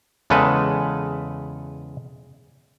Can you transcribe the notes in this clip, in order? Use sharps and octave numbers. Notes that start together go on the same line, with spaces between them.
E2 C#3 G#3 A4 B4